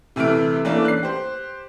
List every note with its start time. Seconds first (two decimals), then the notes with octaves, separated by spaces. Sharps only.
0.16 C3 E3 A3 F6 D7
0.65 E3 A3 A#3 C#4 D4
0.85 F#6 C7
1.03 G4 C5